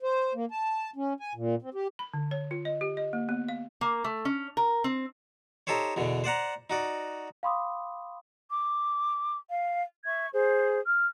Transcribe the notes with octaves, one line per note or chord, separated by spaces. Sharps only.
C5
A#3
A5
C#4
G#5
A#2
C4
G4
B5
D3
C#5
F4
D#5
G4
D#5
A#3
B3
F5
A#3
A3
C#4
A#4
C4
D#4 G4 A4 C5 C#5
E2 B2 D3
C5 D5 F#5 A#5
D#4 F#4 D5
F5 G5 B5 C6 D6 D#6
D6
F5
E5 C#6 G#6
G#4 C5
F6